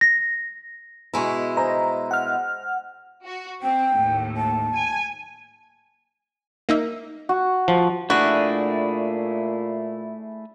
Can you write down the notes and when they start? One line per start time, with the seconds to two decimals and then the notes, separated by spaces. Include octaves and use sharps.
0.01 A#6
1.14 B2 G#3 E4 A#5 B5 C#6
1.57 C5 D#5 G#5 A#5
2.11 F#5 F6
3.26 F#4
3.63 C4 G5
3.95 D#2 A2
4.37 A5
4.75 G#5
6.69 A#3 D#4 E5
7.29 F#4
7.68 F3
8.10 A#2 A3 D4 E4 F#4 G#4